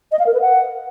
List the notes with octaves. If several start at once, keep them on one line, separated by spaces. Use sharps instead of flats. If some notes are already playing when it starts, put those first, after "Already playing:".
D#5
F5
A#4
B4
F#5